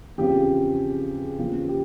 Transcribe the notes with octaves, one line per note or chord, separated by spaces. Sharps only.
E2 C#3 F3 C4 G4
E2 C#3 F3 A#3 F4
G4